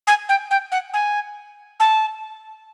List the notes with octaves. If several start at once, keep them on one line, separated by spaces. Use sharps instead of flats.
G#5
G5
G5
F#5
G#5
A5